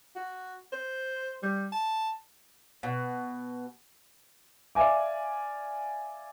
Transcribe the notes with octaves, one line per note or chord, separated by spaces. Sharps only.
F#4
C5
G3
A5
B2
D5 E5 F5 G#5 D6